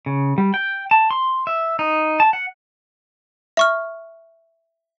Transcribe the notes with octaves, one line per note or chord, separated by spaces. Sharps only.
C#3
G3
G5
A5
C6
E5
D#4
A5
F#5
E5 C#6 F6